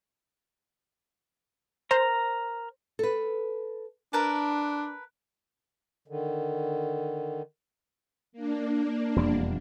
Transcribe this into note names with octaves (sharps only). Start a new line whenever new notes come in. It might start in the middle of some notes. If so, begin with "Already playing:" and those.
A#4 C5 A#5
A4 B4
D4 A#4 B4 A5
D3 D#3
A#3 D4
E1 F2 G3